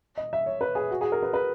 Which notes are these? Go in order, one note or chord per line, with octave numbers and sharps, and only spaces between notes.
D#5
E5
C#5
B4
G#4
F#4
G#4
A#4
B4
B4